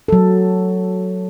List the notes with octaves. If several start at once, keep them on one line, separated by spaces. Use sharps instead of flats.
F#3 A4